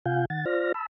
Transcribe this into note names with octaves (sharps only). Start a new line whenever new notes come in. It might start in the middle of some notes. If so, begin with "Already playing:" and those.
C3 F4 F5 F#5 G#5 G6
D#3 F#5 A6
F4 C5 D5 F6 A#6
A5 B5 E6